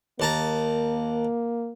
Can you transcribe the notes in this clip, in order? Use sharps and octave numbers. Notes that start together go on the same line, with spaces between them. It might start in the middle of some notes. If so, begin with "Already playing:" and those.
D#2 A#3 A5 A#5